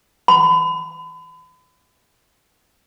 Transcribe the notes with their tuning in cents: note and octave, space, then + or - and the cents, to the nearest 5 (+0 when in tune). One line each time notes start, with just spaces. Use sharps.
B5 +40